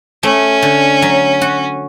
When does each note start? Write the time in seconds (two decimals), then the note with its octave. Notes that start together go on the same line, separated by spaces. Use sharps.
0.22 A3 C#4
0.62 D3
1.02 F#3
1.41 F#4